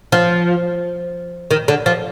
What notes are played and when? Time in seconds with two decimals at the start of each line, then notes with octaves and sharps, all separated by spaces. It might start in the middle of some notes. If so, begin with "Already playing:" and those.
0.12 F3
1.51 D#3
1.68 D3
1.86 F3